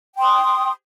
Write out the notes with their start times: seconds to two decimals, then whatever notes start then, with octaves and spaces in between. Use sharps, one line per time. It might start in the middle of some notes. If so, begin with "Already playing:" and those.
0.14 G5
0.18 C6
0.23 D#6